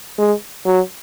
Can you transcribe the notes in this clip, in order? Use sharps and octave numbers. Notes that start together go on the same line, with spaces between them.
G#3
F#3